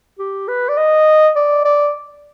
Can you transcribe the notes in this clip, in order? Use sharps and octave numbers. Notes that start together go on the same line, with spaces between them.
G4
B4
D5
D#5
D5
D5